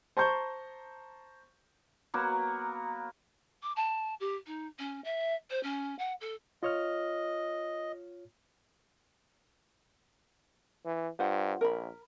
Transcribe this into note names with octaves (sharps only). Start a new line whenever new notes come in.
C5 A5 A#5 C6 C#6 G6
F#3 A#3 B3 F#4
D6
A5
G4
D#4
C#4
E5
C5
C#4
F#5
A4
F4 C#5 D#5 F6
E3
G2 F4 C5 F#5
A#1 A#4 B5